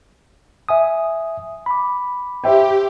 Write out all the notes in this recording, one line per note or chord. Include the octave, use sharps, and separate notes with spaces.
E5 G#5 D#6
B5 D6
G4 C5 E5 G5